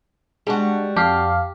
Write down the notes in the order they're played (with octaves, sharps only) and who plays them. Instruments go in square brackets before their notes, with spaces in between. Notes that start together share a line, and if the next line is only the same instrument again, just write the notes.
[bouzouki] G3 F#4 [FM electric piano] G#3 D4
[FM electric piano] F2 F5 [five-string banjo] G4 [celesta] A5 D6